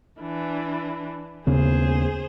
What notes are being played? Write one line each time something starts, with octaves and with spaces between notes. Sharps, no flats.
E3 D4
D#2 C#3 B3 G#4 C5